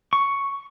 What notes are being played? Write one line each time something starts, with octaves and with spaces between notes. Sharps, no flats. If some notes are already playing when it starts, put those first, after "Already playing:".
C#6